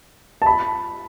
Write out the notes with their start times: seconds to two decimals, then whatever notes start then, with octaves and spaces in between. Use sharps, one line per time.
0.42 A5
0.46 B5